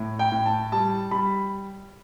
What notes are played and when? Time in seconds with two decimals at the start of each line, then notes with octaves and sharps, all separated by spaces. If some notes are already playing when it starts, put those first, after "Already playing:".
Already playing: A2
0.19 G5
0.32 A2
0.46 A5
0.72 G3 A5
1.11 G3 B5